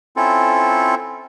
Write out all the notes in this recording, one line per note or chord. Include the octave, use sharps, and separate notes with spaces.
C4 C#4 E4 F4 A4